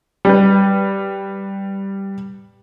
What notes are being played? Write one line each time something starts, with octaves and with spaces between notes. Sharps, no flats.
G3 B4